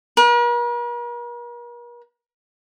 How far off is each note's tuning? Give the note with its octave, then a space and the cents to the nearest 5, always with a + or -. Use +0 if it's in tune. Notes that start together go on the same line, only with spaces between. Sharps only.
A#4 +45